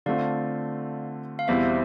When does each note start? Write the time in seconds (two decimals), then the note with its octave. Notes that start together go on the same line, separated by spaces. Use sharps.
0.06 D3 A3 C4 F4 D5 F5
1.39 F5
1.48 E2 B2 G3 C4 E4 C5 E5